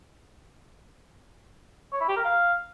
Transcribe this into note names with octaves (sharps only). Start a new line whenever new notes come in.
C#5
E4
G4
A#4
F5